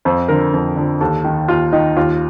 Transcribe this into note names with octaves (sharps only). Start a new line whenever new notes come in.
F2 C5
D3 F3 A#4
F2
D3 F3
D#2 A4
D#3
D#2 F4
D#3 D#4
D#2 F4